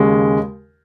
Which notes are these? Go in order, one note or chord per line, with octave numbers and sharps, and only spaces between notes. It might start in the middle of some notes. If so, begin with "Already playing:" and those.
Already playing: D#2 C#3 G#3